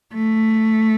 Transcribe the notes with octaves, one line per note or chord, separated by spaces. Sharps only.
A3